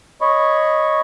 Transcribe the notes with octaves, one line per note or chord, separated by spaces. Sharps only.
C#5 D#5 B5 C#6